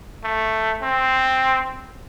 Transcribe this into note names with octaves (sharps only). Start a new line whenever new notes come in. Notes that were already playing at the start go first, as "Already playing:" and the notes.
A3
C4